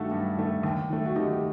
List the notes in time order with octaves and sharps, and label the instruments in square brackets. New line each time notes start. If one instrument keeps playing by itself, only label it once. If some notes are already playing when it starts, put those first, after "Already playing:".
Already playing: [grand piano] G2 D#3 A3 F#4 A4
G2
D#3 A3
D#2
D#3 A3
F#4
D#2 D#4 G4
G4